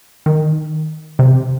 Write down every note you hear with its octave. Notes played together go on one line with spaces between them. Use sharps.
D#3
C3